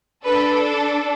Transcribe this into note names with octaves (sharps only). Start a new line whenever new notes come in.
D4 A4 B4